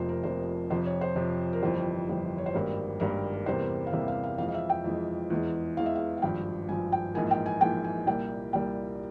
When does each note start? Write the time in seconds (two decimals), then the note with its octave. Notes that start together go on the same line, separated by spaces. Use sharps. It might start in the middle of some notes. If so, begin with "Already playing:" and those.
Already playing: F1 F2 C3 F3 A#3 C5
0.09 A#4
0.23 F1 F2 C3 F3 A#3 C5
0.70 F2 C3 F3 C5
0.86 C#5
1.01 C5
1.16 F2 C3 F3
1.53 A#4
1.62 G1 F2 E3 G3 C5
2.09 G1 F2 E3 G3
2.38 C#5
2.46 C5
2.54 G#1 G2 G3 A#3 A#4
3.00 G#1 G2 G3 A#3 A#4
3.33 A#4
3.46 E2 C3 G3 A#3 C5
3.87 F5
3.92 E2 C3 G3 A#3 E5
4.08 F5
4.23 F5
4.38 F2 E3 G#3 F5
4.48 F5
4.54 E5
4.70 G5
4.84 F2 E3 G#3
5.30 E2 E3 G#3
5.77 E2 E3 G#3 F5
5.86 E5
5.95 F5
6.17 F5
6.22 G#1 G2 F3 G5
6.68 G#1 G2 F3 G#5
6.92 G5
7.14 A#1 G#2 E3 A#3 G#5
7.31 G5
7.46 G#5
7.61 A#1 G#2 E3 A#3 G5
7.84 G#5
8.06 C2 A#2 G3 A#3 G5
8.53 C2 A#2 G3 A#3 G5